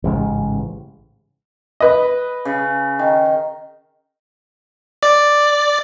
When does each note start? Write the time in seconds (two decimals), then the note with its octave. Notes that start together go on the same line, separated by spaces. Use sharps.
0.04 A1 G#2 C#3
1.80 B4 D#5
2.45 C#3
2.99 D#3
5.03 D5